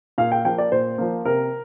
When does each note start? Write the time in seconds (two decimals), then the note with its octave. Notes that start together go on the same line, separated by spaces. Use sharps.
0.18 A#2 F5
0.32 G5
0.45 F3 A#3 G5
0.58 D5
0.72 A#2 C5
0.98 F3 A#3
1.25 C3 A#4